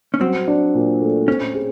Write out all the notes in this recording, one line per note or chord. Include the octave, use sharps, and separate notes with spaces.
C#4
F#3 C4
D4
A#2
A3
C4 C#4
G#4